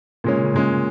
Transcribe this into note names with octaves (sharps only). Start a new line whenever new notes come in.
A#2 C#3 G#3 C#4
C3
C#3
G2 A#2 G#3 C#4